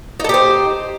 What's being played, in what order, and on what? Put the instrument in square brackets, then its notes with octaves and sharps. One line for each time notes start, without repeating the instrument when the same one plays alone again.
[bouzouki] D#4
A4
G4
C5